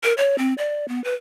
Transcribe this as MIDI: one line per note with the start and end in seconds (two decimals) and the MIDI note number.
0.04 0.14 70
0.18 0.36 73
0.38 0.54 60
0.58 0.86 74
0.88 1.03 59
1.04 1.13 71